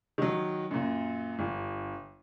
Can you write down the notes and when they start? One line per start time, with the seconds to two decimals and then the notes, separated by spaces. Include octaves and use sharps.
0.18 D#3 F#3
0.71 F#2 A#2
1.39 G1